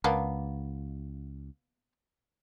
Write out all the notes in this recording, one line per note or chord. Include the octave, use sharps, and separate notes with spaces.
C#2 A#3 B3 D4